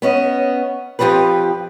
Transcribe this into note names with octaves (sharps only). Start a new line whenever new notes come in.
B3 C#4 D#5
F2 C#3 F3 G4 B4